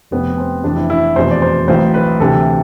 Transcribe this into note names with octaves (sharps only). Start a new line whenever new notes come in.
F1 F2 C3 B3
C4
F1 F2 E3 D4
E4
E4
F1 E2 B2 C5
D5
C5
B1 A2 E3 C5
B4
D2 C3 E3 A4